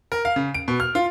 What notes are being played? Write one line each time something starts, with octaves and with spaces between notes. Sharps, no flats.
A#4
F5
C#3
D7
B2
F6
F4